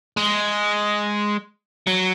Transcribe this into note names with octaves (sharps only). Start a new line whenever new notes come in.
G#3
F#3